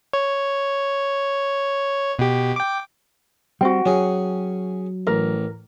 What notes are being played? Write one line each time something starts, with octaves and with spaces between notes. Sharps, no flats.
C#5
B2 G4
G5 D6
G3 C4 F#4 G5
F#3 C#4 G#4
A1 A#4